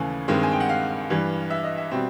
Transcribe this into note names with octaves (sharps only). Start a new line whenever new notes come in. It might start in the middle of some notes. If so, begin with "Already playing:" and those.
Already playing: D#2 C#3 E3 A3 G#5
G2 D#3 G#3 C4
G#5
G5
F#5
F5
G2 E3 G3
E5
D#5
E5
B2 G3 C4